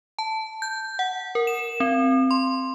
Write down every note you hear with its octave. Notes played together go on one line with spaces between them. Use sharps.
A5
G6
F#5
A#4
E7
C4
C6